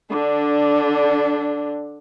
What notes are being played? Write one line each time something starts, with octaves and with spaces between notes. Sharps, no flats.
D3 D4